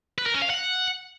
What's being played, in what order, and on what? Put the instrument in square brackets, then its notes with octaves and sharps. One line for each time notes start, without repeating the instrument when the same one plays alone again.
[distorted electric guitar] B4
A#4
C#4
F5
F#5